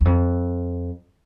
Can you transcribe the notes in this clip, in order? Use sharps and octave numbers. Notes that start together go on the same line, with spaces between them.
E2
F2